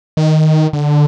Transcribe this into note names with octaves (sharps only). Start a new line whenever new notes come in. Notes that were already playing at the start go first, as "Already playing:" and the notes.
D#3
D3